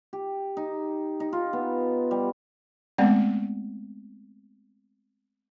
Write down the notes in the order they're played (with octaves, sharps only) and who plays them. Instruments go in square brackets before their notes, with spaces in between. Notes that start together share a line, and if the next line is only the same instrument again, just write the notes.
[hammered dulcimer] G4
D#4
D#4
F4
B3
G3
[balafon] G#3 A3 B3 C4 D5